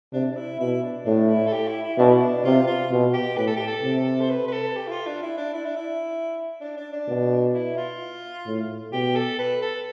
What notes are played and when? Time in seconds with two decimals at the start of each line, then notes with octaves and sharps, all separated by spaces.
0.13 C3 D4
0.31 D4
0.36 E4
0.60 B2 E4
0.82 D4
1.05 A2 D4
1.28 E4
1.47 A4
1.52 G4
1.68 E4
1.83 E4
1.98 B2 D4
2.10 E4
2.21 D4
2.44 C3 F4
2.67 F4
2.91 B2
3.13 G4
3.37 A2 B4
3.47 A4
3.57 G4
3.67 A4
3.83 C3
4.20 C5
4.30 B4
4.48 B4
4.53 A4
4.76 G4
4.88 E4
4.91 F4
5.07 D4
5.22 E4
5.37 D4
5.53 E4
5.65 D4
5.76 E4
6.61 D4
6.77 D4
6.92 D4
7.08 B2
7.54 E4
7.77 F4
8.46 A2
8.93 B2 G4
9.15 A4
9.39 B4
9.62 A4